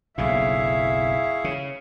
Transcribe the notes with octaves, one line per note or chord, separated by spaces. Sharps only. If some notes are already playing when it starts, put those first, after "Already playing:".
F#1 B1 A2 E4 G#4 E5 F5 C#6
C#3